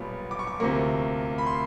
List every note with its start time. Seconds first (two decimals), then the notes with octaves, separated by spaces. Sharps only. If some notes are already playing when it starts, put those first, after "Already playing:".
Already playing: B1 A#2 G3 B3
0.31 D6
0.39 C#6
0.47 D6
0.60 D2 C3 F3 A#3 C#6
1.38 B5
1.47 C6